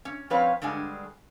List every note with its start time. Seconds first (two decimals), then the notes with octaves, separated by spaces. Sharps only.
0.05 C#4
0.30 F3 C4 C#4 B4 C#5 F5
0.62 G2 D3 G3 G#3 G#5